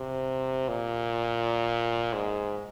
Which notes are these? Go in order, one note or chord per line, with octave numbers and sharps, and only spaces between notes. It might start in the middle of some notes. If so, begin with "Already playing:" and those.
Already playing: C3
A#2
G#2